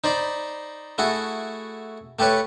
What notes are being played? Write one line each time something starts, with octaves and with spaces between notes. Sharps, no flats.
D#4 C5 D5 B5
A3 E4 F#4 G#4 A4
A3 G4 A4 B4 C#5